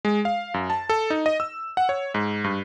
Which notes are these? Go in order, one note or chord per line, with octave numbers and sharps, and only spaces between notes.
G#3
F5
F#2
A5
A4
D#4
D#5
E6
F#5
C#5
G#2
G2